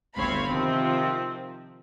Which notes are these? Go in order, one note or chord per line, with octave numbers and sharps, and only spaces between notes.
G1 D2 C4 C#5 F5 B5
C3 D#3 F3 C4